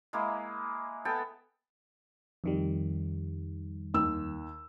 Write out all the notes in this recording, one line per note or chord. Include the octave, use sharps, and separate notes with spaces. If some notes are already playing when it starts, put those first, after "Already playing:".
G#3 A#3 E4
B3 A4 G5 G#5
F2 D#3 G3
D#2 E6